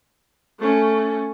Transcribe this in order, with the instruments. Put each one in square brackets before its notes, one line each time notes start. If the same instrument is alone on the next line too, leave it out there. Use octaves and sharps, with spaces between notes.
[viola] A3 C#4